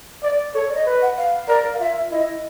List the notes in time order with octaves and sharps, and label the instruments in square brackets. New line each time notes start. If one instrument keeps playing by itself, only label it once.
[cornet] D5
[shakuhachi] A4 [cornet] C#5
[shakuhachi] D5
D#5
[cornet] B4
[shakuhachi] F#5
F5
[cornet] A#4 [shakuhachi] D5
[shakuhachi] F5
[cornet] F4 [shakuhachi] E5
[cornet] E4 [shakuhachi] D#5